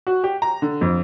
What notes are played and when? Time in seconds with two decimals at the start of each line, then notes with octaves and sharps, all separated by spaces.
0.07 F#4
0.24 G4
0.42 A#5
0.62 D3
0.81 F2